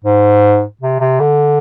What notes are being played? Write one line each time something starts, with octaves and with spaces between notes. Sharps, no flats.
G#2
C3
C3
D3